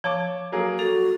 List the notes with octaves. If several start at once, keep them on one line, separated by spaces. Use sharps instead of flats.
F3 C#5 A5 D6
F#3 A#3 G#4
F#4 A4 F7